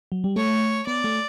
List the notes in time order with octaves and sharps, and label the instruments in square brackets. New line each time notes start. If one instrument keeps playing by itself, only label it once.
[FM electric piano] F#3
G3
[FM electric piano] A3 [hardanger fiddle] C#5
[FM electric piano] B3 [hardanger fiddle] D5
[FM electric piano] A3